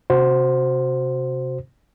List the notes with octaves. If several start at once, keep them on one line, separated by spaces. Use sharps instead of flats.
C3 F#4 C5